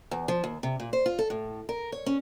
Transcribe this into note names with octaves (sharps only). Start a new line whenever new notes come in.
E2
F3
D#2
C3
A#2
C5
F4
A4
A2
A#4
C#5
C#4